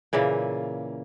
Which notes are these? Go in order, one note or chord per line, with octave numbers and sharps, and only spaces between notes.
A#2 C#3 E3 A#3